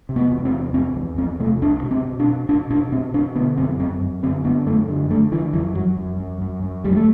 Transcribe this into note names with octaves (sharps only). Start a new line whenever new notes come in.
C3
B3
E2
C4
C3
E2 C4
E2
E2 C4
C3 A3
C2 D4
B2
C4
B2
D4
B2
B2 D4
B2 D4
B2 C4
B2 D4
D3 B3
F#2 C4
F#2 C4
F#2
D3 C4
D3 B3
F#2 A3
D3
D3 A3
D3 E3
F#2 E3
F#2 F#3
F#2
F#2
F#2
F#2
D2 G3
A3